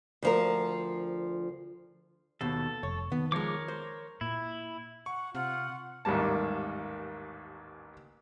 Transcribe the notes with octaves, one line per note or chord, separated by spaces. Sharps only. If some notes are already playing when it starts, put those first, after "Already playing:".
D2 F3 A#4
D#2 B2 A4
F1 C#5
D#3 B3
F3 G#3 A#4 C#5 D6
C5
A#2 E4
F#5 C#6
C3 F4 F#5
A1 D#2 G#2 G3 A#3 A5